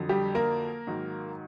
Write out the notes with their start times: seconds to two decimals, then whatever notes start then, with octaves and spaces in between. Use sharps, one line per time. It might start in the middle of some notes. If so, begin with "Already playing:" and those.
Already playing: F2 D3 F#3
0.09 G3 G4
0.35 A#3 A#4
0.87 G#2 D#3 F#3